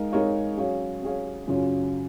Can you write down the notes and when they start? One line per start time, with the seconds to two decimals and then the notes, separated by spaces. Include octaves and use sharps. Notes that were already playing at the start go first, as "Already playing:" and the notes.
Already playing: G#3 D#4 A#4 F5
0.11 G#3 D#4 A#4 C#5 F5
0.57 F#3 C#4 G#4 C#5 F5
1.03 F#3 C#4 G#4 C#5 F5
1.47 F#2 C#3 F#3 C#4 F4